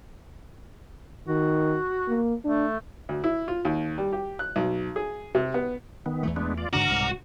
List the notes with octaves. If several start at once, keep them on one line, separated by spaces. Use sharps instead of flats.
D#3 F#4
A#3
A3 D4
D2
E4
F4
D#2
G3
G4
F#6
B1
G#4
C3
B3
D#3 B3
E2 E3 A3
G#3 B3 D4
F4 D5
G#2 D3 D4 F#4 A#5 D6 F6
C2 G#2 B2